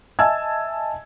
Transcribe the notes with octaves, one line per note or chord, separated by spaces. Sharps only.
D#5 E5 G#5 A5 E6 G#6